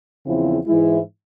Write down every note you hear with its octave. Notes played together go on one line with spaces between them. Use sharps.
E2 C#3 F3 C4 E4
G#2 E3 G#3 E4